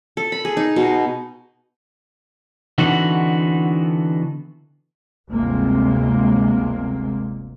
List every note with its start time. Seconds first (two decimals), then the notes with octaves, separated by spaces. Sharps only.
0.17 A4
0.32 B5
0.45 G#4
0.57 D#4
0.76 B2
2.78 D3 E3 B3 C4 D#4 F#4
5.30 G1 D2 C3 G#3 A#3 C4